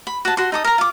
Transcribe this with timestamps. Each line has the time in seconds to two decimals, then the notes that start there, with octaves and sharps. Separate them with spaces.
0.07 B5
0.25 F#4 A5
0.37 F#4 C6
0.52 D#4 A4 D#6
0.64 A#4 A#5
0.78 F4 D6